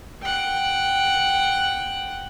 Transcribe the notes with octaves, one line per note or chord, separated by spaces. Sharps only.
F#5 G5